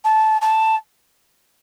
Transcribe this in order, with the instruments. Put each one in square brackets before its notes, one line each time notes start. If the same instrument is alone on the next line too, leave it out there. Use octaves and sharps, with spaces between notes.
[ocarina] A5
A5